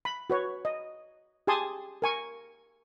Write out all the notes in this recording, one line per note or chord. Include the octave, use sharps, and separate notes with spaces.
B5
F#4 B4 C#5
D#5
G4 G#4 G#5 A5 C6 D#6
A#4 G#5 C#6